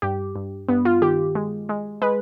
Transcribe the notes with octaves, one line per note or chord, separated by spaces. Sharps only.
G2 G4
G2
G2 B3
F4
D#3 G4
G#3
G#3
G#3 B4